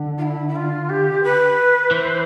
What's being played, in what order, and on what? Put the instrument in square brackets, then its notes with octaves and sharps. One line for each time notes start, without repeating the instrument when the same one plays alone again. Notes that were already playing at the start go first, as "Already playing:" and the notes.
Already playing: [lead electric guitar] D3
[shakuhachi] F4
E4
E4
F4
G4
B4
[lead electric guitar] E3 [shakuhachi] C5